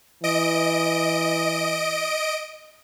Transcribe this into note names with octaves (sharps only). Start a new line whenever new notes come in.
E3 D#5 D7